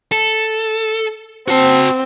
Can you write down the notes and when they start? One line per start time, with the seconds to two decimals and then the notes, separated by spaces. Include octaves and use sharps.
0.12 A4
1.48 C4 F#4 A5